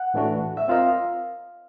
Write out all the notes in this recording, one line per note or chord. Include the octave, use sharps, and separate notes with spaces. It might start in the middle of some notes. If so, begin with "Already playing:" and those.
Already playing: F#5
A2 E3 A3 D4 F#4
E5
C4 F4 A#4 D#5 F5